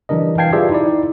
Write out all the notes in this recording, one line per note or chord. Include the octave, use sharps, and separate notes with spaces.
E3 G3 D4 A#4 D#5
E3 F5 G5 A5 G#6 C7
F4 G4 G#4 B4 D5 E5
D#4 E4 D5